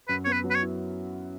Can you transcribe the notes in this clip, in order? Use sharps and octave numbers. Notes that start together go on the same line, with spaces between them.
F#2 B4
B3 C#5
B4
F#3
B4
C#5
E4